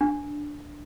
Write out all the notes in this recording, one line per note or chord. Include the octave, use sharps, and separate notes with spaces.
D4